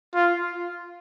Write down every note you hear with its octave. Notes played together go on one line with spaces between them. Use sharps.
F4